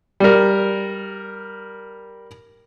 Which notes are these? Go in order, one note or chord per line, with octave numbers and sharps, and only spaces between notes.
G3 A#4